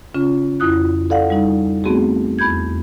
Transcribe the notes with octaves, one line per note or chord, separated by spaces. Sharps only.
C#3 C#4 F4
F2 E4 D#6 F#6
A4 D5 F5 F#5
G3 D#4
A3 B3 C4 F#4 G#4
E2 B5 G6 G#6